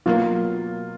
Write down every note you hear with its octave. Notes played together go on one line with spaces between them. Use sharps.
B2 F#3 A#3 F4